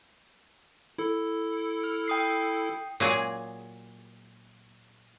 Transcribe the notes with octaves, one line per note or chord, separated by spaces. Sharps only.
E4 A4
F6
G5 D#6 C7
A#2 F#3 G#4